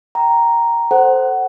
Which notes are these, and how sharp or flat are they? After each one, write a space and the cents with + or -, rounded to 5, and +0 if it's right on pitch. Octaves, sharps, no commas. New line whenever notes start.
G5 -15 A#5 +0
A4 +0 C5 +0 F#5 +20